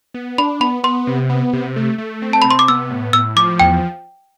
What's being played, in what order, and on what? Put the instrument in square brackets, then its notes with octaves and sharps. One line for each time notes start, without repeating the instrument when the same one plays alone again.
[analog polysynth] B3
[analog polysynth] D4 [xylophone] B5
[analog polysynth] B3 [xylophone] B5
[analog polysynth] B3 [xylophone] C6
[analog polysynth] C3
B3
C3
A3
A3
C4
[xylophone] A5
[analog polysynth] C3 [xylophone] B5
[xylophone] C6
D6
[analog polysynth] B3 [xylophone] E6
[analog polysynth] A2
[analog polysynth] A2 [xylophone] E6
[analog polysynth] F3 [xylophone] D6
[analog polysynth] E2 [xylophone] G5